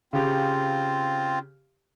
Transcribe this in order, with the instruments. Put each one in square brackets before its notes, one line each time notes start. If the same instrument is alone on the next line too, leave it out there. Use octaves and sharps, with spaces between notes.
[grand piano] C#3 G4 [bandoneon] C4 F4